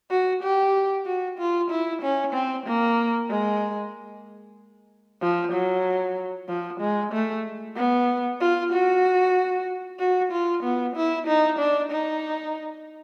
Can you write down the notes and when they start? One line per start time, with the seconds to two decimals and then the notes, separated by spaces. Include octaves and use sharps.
0.11 F#4
0.43 G4
1.06 F#4
1.39 F4
1.71 E4
2.02 C#4
2.33 C4
2.66 A#3
3.30 G#3
5.22 F3
5.53 F#3
6.48 F3
6.81 G#3
7.12 A3
7.77 B3
8.41 F4
8.73 F#4
9.99 F#4
10.32 F4
10.63 B3
10.96 E4
11.27 D#4
11.59 D4
11.91 D#4